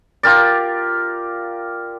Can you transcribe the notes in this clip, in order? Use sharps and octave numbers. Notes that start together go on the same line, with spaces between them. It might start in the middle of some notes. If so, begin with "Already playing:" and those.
F4 G4 A#4 D5